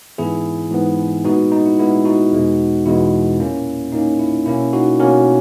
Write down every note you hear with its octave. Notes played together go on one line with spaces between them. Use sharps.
G#2 E3 B3 E4 G#4
G#2 E3 B3
A#2 G#3 B3 D#4 F#4
D#4
E4
A#2 G#3 B3 E4
D#4 F#4
E2 B2 G#3 B3
E2 B2 G#3 B3 E4
A#2 A#3 C#4
A#2 A#3 C#4 D#4
E4
B2 A#3 C#4 E4
D#4 F#4
B2 A#3 C#4 F#4 A#4